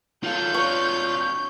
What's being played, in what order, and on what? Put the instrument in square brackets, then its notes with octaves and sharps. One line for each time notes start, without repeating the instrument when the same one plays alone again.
[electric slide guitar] D#3 F#3 A4 [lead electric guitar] F4 F5 [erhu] G6
[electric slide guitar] C4 D4 F#4 [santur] C#5